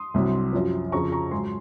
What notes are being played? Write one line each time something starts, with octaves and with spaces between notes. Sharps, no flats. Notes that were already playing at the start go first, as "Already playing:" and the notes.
Already playing: C6 D#6
C2 C3 F#3
F#2 F3
F2 C#3 F3 A#5 C#6
A#5 C#6
G#2 F#3 G#5 C6